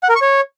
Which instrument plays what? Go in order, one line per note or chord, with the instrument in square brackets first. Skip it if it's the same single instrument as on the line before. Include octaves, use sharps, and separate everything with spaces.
[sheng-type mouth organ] F#5
A#4
C#6
C#5